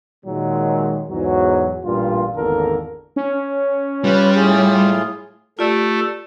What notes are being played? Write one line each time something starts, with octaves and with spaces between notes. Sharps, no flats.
A#2 D#3 F#3 G#3
B1 E2 G#2 F#3
A1 G2 A#2 F4
G#1 E2 D3 A#3 A4 A#4
C#4
G3 F4 B4
A2 F4 G#4
A3 F4 G4 D5